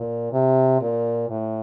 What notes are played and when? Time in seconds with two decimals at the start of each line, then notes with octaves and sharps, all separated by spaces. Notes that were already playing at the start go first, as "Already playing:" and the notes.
Already playing: A#2
0.32 C3
0.81 A#2
1.30 A2